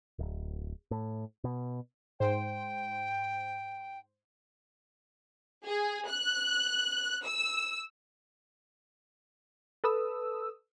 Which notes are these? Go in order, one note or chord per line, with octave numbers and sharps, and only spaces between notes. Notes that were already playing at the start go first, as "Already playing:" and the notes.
D1
A2
B2
G#2 C5 G5
G#4
F#6
E6
A4 B4 D#6 E6